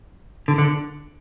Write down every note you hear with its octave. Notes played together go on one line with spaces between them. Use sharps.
D3
D3